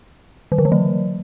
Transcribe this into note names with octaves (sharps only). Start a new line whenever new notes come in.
D#3
D3
E3
F#3